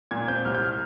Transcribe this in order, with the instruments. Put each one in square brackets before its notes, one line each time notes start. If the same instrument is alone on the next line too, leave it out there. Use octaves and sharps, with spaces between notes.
[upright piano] A#2 G#6
C4 G6
C2 F6
G6
F6